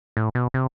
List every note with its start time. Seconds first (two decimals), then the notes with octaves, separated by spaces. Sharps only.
0.17 A2
0.35 B2
0.54 C3